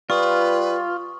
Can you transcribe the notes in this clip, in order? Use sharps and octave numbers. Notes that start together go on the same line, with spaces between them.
G3 F4 B4 C#6 D#6